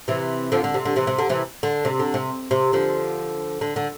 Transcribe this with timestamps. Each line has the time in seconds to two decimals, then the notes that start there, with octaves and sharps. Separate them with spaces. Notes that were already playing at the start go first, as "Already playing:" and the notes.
0.08 C3 E3
0.52 D3 F3
0.64 D3
0.74 C3
0.85 D3
0.96 C3 E3
1.07 C3
1.18 D3
1.29 C3 E3
1.63 D3
1.85 C3
1.99 D3
2.14 C3
2.51 C3
2.73 D3 F3
3.61 D3
3.76 D3